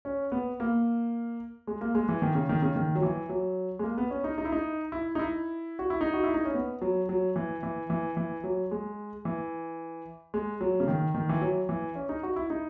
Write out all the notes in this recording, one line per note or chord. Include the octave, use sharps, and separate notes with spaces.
C#4
B3
A#3
G#3
A#3
G#3
E3
D#3
C#3
D#3
C#3
D#3
F#3
E3
F#3
G#3
A#3
B3
C#4
D#4
D#4
E4
D#4
E4
D#4
E4
F#4
E4
D#4
F#4
E4
D#4
C#4
B3
F#3
F#3
E3
E3
E3
E3
F#3
G#3
E3
G#3
F#3
C#3
D#3
D#3
E3
F#3
E3
C#4
D#4
F#4
E4
D#4